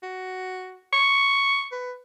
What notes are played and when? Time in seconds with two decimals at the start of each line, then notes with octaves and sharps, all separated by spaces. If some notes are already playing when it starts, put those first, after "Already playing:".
0.03 F#4
0.93 C#6
1.72 B4